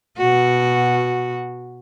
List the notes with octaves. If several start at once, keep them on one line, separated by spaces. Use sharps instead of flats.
B2 F#4